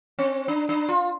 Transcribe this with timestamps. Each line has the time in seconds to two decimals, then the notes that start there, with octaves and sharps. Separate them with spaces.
0.18 C4
0.48 D4
0.69 D4
0.89 F4